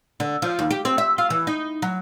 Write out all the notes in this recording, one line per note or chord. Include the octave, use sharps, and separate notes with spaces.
D3
F3
D#2
G4
C4
E5
F4
E3
D#4
F#3